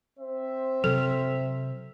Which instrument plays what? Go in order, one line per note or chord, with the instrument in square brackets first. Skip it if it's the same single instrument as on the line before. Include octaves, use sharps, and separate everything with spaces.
[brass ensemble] C4 C5 E5
[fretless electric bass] C3 F#3 [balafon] A4